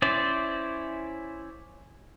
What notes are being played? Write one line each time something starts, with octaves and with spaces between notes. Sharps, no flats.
C#4 E4 C5 D5